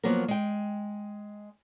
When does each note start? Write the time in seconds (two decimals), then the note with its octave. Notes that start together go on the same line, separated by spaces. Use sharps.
0.04 F3 F#3 A#3 B3 A#4
0.28 G#3 G5